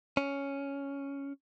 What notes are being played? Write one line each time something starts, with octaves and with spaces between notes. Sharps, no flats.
C#4